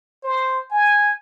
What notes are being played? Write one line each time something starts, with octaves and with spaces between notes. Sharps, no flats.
C5
G#5